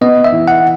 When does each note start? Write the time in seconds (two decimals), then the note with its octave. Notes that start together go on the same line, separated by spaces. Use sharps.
0.01 B3 D#5
0.24 E5
0.32 E3
0.48 F#5